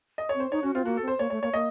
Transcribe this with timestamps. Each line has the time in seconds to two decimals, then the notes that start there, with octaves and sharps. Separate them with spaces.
0.18 D#5
0.29 C#5
0.35 C4
0.40 C5
0.52 D#4 C#5
0.63 C#4 F#4
0.74 C4 F4
0.85 A#3 F#4
0.97 A4
1.02 C4
1.08 C5
1.19 A#3 C#5
1.30 A3 C#5
1.42 A#3 C#5
1.53 A#3 D#5